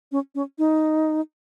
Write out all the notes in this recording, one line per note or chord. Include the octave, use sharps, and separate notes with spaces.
C#4
C#4
D#4